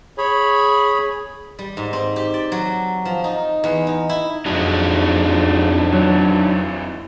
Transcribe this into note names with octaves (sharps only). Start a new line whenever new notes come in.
G#4 C#5 B5
G3
G#2
C4
G4
D5
F#3
F3
D#4
E2
D#4
E4
F2 F#3 G#3 D4 D#4 F#4
C3 E3 F#3